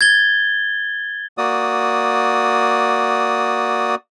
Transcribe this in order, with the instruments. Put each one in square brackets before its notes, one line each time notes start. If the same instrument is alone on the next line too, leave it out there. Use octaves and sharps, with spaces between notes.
[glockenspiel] G#6 A6 G7
[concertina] A#3 F#4 D5 D#6